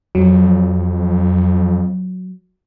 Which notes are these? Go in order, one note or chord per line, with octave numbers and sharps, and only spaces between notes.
F2 F#3